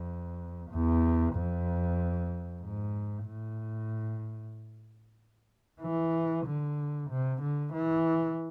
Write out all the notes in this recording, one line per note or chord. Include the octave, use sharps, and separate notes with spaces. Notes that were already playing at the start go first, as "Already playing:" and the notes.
Already playing: F2
E2
F2
G#2
A2
E3
D3
C3
D3
E3